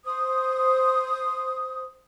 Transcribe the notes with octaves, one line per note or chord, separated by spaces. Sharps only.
C5 D#6